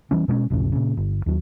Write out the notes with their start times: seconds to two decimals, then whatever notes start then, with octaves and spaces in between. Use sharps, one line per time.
0.11 E3 G3 C#4
0.28 B2 G#3 A#3 C#4
0.50 B1 F2 A2 C#3
0.72 A#2 C#3
0.97 G1
1.26 D#2 F#3